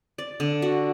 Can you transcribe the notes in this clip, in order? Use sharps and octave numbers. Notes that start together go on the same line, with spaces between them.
D5
D3
F#4